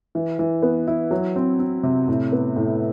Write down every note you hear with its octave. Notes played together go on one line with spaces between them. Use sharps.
E3
E3
B3
E4
F#3
C4
C4
C3
A2
B3
A2